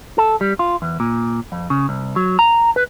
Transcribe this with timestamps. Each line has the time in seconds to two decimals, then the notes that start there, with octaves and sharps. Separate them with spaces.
0.18 A4
0.41 G3
0.59 F4
0.82 E2
1.00 A#2
1.52 F2
1.70 C#3
1.89 C2
2.16 F#3
2.39 A#5
2.76 B4